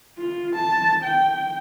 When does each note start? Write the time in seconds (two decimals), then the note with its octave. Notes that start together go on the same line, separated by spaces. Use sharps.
0.18 F4
0.55 A5
1.03 G5